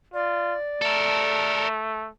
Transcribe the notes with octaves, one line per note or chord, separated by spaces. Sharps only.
F4 D5
A3 A4 A#4